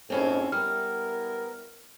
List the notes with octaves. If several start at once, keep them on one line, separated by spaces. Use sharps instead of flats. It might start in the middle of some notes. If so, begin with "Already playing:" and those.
A#1 F2 G#2 C4 C#4 E4
G3 B3 E4 A#4 F6